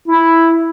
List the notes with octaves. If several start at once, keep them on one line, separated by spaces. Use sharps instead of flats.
E4